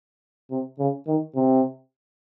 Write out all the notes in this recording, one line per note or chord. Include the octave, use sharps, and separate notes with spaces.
C3
C#3
D#3
C3